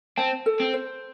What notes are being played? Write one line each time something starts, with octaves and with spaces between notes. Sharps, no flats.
C4 A5
A4
C4
C5